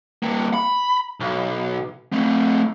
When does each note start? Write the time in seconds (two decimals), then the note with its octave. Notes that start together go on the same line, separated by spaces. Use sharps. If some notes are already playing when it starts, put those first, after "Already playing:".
0.23 G3 A#3
0.54 B5
1.20 B1
2.12 A3 C4